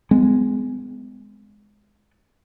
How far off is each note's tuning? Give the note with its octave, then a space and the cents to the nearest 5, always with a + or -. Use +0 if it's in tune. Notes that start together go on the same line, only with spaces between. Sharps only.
G#3 +0 B3 +40